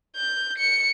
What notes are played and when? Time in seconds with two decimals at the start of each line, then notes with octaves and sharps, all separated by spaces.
0.17 G6
0.58 C#7